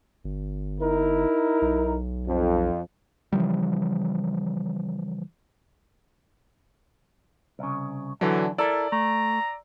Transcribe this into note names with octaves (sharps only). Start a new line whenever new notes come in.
G1
D#4 E4 A#4
B1
F2
C#3 E3 F3 G3
C2 C#3
D3 E3 F#3 D4
E4 A4 A#4 D5 E6
A3 A#5